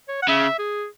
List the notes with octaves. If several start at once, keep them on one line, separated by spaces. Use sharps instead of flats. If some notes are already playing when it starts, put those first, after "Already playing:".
C#5
F#5
C#3 E5
G#4